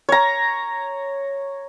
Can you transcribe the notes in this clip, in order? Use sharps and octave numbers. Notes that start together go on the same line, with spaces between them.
C#5 A#5